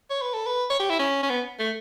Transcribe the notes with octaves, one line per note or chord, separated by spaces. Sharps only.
C#5
B4
A4
B4
C#5
G4
E4
C#4
C#4
B3
A3